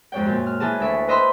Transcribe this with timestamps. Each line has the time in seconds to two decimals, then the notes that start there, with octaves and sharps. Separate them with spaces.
0.12 F2 G#2 C#5 G5
0.25 F#2 A#2
0.47 F6
0.60 E3 G#4 A5
0.80 D2 E5 C#6
1.08 B4 C5 D#5 E5 B5 C6